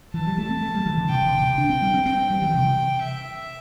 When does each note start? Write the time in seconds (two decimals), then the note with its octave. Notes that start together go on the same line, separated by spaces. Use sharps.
0.14 E3 A5
0.26 G3
0.38 A3
0.50 C4
0.62 A3
0.74 G3
0.86 E3
0.97 D3
1.09 C3 G5
1.26 D3
1.42 C3
1.58 D4
1.69 C4
1.82 G3
1.94 C4
2.06 C4 G5
2.30 G3
2.42 E3
2.54 C3
3.02 E5